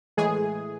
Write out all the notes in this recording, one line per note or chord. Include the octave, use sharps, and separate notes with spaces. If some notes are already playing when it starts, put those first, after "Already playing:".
A2 E3 G#3 G#4